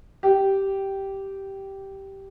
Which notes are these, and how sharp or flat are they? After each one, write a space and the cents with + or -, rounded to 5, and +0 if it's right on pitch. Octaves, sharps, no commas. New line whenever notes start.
G4 -10